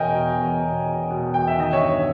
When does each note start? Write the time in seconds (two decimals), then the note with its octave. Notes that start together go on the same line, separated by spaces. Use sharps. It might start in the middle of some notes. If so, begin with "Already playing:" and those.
Already playing: E2 B2 A#4 C#5 D#5 G5 G#5
0.15 B2
0.39 E2
0.63 B2
0.86 E2
1.10 B2
1.34 E2 G5
1.48 E5
1.58 D#3 D#5
1.73 C#5 E5
1.83 G2